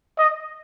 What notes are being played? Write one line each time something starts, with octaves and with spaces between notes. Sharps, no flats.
D#5